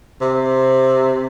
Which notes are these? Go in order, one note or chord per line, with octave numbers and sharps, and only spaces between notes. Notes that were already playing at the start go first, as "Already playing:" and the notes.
C3